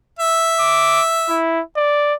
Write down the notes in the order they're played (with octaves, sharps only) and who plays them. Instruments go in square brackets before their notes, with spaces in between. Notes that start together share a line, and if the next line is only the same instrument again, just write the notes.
[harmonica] E5
[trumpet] D6
E4
D5